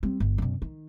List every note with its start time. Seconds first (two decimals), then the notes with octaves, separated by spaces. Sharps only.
0.03 G3 C4
0.20 G1
0.38 F#2 B2
0.62 D#3